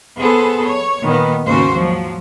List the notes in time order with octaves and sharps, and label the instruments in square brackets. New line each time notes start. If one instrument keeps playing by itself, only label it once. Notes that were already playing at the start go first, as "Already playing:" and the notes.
[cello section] B3 G#4 A4 C5
C#5
A#2 D#3 B3
D#2 G#2 C#3 C#4 F#4 C5
F3 F#3